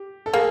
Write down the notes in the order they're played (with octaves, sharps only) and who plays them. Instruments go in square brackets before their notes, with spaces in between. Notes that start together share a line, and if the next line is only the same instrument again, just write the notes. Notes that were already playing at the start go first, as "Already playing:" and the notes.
Already playing: [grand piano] G4
A4
[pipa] A#3 [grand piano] G#4